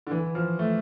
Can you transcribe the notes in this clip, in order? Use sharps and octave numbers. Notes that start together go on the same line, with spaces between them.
D3
E3
F3
A3